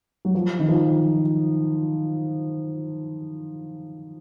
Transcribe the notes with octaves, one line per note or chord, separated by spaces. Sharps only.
F#3
F3
D#3
F3